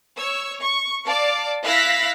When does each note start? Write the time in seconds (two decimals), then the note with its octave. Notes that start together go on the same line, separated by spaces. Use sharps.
0.16 C#5 E6
0.62 C#6
1.06 D5 F5 A5 D6
1.63 E4 F5 E6 F#6 A#6 B6